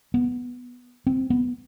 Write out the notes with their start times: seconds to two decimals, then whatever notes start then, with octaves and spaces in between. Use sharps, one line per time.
0.14 B3
1.07 C4
1.30 B3